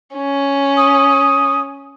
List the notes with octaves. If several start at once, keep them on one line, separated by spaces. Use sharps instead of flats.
C#4
D#6